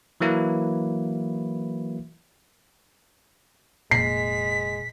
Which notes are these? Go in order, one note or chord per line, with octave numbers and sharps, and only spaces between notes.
E3 F#3 A#3 E4 B4
F1 A#2 G#3 B6 C7